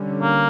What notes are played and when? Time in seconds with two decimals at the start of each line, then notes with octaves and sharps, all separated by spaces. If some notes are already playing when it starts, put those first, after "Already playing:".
Already playing: D3 G3 C#4
0.22 A#3